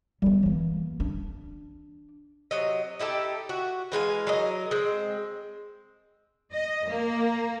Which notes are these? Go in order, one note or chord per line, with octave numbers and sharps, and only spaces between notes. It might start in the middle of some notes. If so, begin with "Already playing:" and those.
G3 B3
E3 A#3
D4
C3 F#3 D#5
D#4 E4 G4 A4
F#4
E3 G#3 F5 G#5
F#3 A#4 D#5
G#3 C4
D#5
A#3